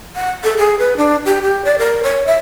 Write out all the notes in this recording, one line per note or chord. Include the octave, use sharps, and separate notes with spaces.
F#5
A4
G#4
B4
D4
G4
G4
D5
A#4
C#5
E5